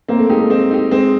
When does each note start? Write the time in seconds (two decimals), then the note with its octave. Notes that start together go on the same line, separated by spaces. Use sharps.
0.08 A#3 C4
0.19 A3
0.30 G#3 D#4 G4
0.40 A3
0.50 C4
0.71 D#4 G4
0.91 G#3 C4